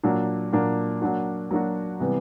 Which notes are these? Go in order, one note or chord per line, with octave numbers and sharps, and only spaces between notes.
A#2 F#3 A#3 D4
A#2 F#3 A#3 D4
F#3 A#3 D4 F#4
F#3 A#3 D4 F#4
C3 E3 G3 B3